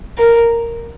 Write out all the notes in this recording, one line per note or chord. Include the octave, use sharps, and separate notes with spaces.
A#4